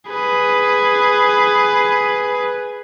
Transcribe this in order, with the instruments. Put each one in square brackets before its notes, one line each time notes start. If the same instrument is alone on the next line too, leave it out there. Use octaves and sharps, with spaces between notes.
[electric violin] G#4 B4